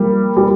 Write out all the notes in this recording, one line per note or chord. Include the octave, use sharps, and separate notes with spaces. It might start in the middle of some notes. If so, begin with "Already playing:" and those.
Already playing: F3 G3 A#3
G3